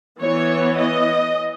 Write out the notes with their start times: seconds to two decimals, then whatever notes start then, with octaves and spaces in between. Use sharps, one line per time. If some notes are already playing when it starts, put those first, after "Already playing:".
0.20 E3 B3 C#5
0.77 D#5